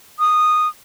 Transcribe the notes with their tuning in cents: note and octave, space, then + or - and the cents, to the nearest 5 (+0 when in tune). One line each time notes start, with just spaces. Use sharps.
D#6 -15